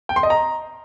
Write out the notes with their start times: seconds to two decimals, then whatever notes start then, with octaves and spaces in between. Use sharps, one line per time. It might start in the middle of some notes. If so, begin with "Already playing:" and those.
0.09 G5
0.16 C6
0.23 D#5
0.30 A#5